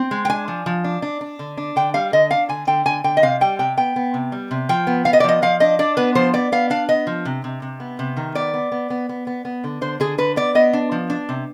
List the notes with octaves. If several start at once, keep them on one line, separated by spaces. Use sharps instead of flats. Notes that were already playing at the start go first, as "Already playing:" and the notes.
Already playing: C4
G#3
G5
D4 G#5
F3
F3
D4
D4
D4
D3
D4
D3 G5
G3 F5
D3 D#5
D4 F5
D3 G#5
D3 G5
D3 G#5
D3 G5
D#5
C3 F5
G3 G5
C3 G5
B3 G5
B3
C3
G3
C3
F3 G5
B3
B3 F5
D#5
D5
F3 D#5
F3 F5
D4 D#5
D4 D5
B3 B4
F3 C5
B3 D5
B3 F5
D4 F5
B3 D#5
F3
C3
C3
C3
B3
C3
D#3
B3 D5
B3
B3
B3
B3
B3
B3
D3
D3 C5
D3 G#4
D3 B4
B3 D5
B3 D#5
D4
F3
D4
C3